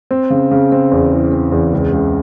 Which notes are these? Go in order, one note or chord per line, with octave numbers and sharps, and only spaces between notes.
C4
C#3
C#3
C4
E2
E3
C4
E2
C#2
C#2